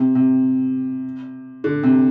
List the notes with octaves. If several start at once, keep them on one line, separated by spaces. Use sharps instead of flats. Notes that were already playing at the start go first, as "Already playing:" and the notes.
Already playing: C3
C3
D3
C3